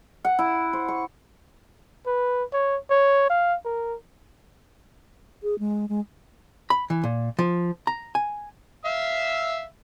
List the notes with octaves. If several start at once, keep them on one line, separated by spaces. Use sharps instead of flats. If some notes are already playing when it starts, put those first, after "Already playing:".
F#5
E4
C5
C#6
B4
C#5
C#5
F5
A#4
G#4
G#3
G#3
B5
E3
A#2
F3
A#5
G#5
E5 F5 E6